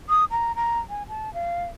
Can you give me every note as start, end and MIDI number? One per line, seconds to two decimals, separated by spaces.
0.09 0.25 87
0.31 0.55 82
0.56 0.80 82
0.90 1.03 80
1.09 1.33 81
1.34 1.65 77